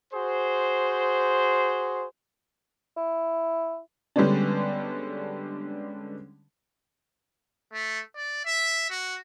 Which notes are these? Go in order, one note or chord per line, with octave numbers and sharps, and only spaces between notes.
F#4 G#4 C5
E4
D3 G3 G#3 B3 C#4 D4
A3
D5
E5
F#4